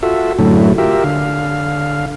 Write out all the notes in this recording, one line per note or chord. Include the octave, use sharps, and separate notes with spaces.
F4 F#4 A4 E5
F#2 A2 D3 F#3 A3 E4
F4 G4 A#4 E5
D3 F5